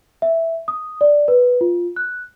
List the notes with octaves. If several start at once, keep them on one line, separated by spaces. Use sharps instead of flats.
E5
D#6
D5
B4
F4
F#6